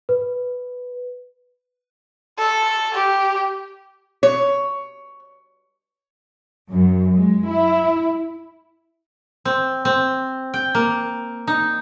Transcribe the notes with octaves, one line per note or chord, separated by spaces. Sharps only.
B4
A4
G4
C#5
F#2
G#3
E4
C4
C4
G5
A#3
D#4